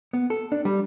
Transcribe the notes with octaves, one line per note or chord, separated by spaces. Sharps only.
B3
A4
D4
G3